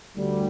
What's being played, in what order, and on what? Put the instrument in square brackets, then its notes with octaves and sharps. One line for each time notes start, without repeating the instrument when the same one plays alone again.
[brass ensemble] D2 D3 G3